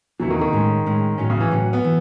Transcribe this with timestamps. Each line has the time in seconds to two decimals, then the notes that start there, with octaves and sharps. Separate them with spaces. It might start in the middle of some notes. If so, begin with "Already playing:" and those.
0.20 D#2 C#3 E3 F#3 B3 E4
0.31 D#3
0.41 D#3
0.53 A2 G#3 C#4
0.86 A2 G#3 C#4
1.18 A2 F#3 C#4
1.30 C#3
1.40 E3
1.51 A2 F#3 C#4
1.73 B3
1.84 E3